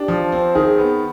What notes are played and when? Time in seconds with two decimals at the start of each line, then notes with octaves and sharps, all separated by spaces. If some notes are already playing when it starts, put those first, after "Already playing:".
Already playing: D4 G4
0.08 F3
0.32 C4
0.55 D#3 G#4
0.78 B3